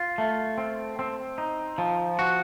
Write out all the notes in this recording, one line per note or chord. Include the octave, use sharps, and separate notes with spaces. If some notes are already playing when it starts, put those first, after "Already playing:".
Already playing: F4
A3
C4
C4
D#4
F3
F#4